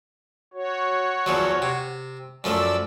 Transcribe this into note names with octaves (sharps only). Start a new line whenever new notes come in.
F#4 C#5
E2 F3 F#3
C3
F#2 F3 A3 D5 E6